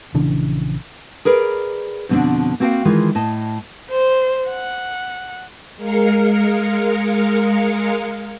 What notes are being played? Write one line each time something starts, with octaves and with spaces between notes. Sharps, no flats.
A#1 C#3 E3 D4
G#4 A#4 B4 D5
F2 B2 D3 C4 D4
A#3 C4 F#4 F5 G5
D#3 E3 G#3 F4
A2 D#5 A5
C5
F#5
G#3 A#4 F5 C#7